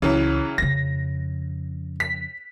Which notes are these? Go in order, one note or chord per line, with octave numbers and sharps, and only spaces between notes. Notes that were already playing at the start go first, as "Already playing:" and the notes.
C#2 C#3 E3 F#3
F2 C#3 A#6
B6